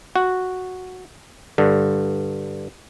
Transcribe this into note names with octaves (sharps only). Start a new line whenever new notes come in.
F#4
G2 D3